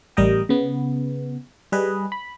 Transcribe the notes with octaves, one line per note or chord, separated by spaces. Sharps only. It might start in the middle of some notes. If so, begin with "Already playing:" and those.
A1 G3 A#4 D#5 G5
C#3 B3
G3 G#4 B4 D#5
B5